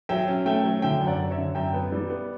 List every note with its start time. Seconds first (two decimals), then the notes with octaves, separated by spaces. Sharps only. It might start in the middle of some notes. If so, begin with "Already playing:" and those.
0.09 F#3 E5 G5
0.28 C#4
0.46 A3 E5 G5
0.64 F#3
0.82 D3 E5 G5
1.01 F#2
1.07 D5 F#5
1.18 F#2
1.31 C#5 E5
1.38 D3
1.55 F#2 E5 G5
1.74 B3
1.92 G3
2.10 B3